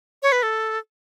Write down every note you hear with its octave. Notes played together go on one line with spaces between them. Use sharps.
C#5
B4
A4